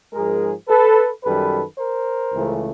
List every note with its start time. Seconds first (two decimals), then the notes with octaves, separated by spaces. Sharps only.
0.13 G#2 F3 G#3 G#4 A#4
0.68 A4 B4
1.23 F#2 D#3 G3 A4 B4
1.78 A#4 C5
2.33 C#2 C#3 E3 A3